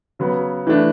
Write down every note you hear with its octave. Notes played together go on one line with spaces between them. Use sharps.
C#3 F#3 B3
E3 A3 D4